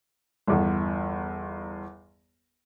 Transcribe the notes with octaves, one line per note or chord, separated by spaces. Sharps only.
G1 E2